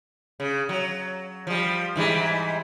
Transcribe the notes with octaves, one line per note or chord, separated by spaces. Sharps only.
C#3
F#3
F3 G3
G#2 E3 G3